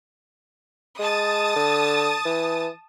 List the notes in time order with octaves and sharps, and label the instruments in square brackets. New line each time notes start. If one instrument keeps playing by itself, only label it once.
[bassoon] G#3 [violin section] A5 D#6 A6
[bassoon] D3
E3